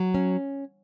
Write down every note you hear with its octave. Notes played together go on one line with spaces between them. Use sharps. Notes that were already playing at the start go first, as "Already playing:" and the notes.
Already playing: F#3
C#4